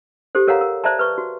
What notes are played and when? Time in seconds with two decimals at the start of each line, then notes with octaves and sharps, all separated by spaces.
0.35 G4 A4 C5
0.47 A4 A#4 C#5 F5 F#5 A#5
0.61 A#4
0.84 C5 D5 E5 A5 A#5
0.99 B4 C#6
1.18 F#4